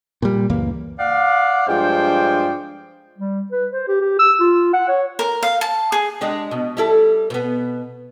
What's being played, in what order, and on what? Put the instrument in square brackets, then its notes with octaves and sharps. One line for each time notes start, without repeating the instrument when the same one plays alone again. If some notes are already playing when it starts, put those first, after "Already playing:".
[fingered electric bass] A#2 G3
C#2 F#2 E3 A#3
[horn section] D5 F5 F#5
G2 F3 G#3 D4 C5 G5
[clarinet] G3
B4
C5
G4
G4
E6
F4
F#5
C#5
[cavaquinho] A#4
F5
A5
G#4
[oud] G#3 D4 G4
B2
G3 E4 A4
B2 B3